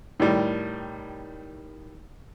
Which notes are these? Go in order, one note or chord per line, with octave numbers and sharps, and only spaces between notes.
A2 D#3 G3